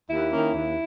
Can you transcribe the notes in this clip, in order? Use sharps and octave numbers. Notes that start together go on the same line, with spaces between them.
D#2 E4
D#3 A#3 C#4
D#2